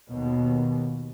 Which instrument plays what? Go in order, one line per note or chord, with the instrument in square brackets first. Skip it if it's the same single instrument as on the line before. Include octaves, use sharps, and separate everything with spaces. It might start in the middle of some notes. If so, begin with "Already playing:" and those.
[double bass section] D#2 B2